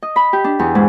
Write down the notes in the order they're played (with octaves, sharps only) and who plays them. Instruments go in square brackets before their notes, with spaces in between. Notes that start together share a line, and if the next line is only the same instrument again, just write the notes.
[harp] D#5
B5
G4
D4
E2
G#2